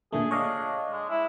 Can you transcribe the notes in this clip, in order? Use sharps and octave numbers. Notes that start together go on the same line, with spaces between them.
A#2 D3 A3 G#4
D4 C#5 D#5 F5
G#3
E4